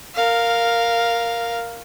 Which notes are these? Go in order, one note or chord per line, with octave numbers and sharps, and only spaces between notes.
A#4 F5